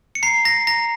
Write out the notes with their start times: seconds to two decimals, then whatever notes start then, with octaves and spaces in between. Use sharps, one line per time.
0.15 C#7
0.23 A#5 C7
0.45 A#5 A#6
0.67 A#5 A#6